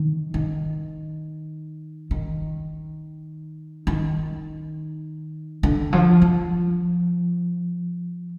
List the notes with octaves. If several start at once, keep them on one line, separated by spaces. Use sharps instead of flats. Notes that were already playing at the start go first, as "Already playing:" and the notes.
Already playing: D#3
D#3
D#3
D#3
D3
F3
F3